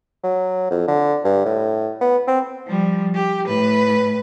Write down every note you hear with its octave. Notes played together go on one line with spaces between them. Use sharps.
F#3
F2
D3
G2
A2
B3
C4
F3 G3
G4
A2 B4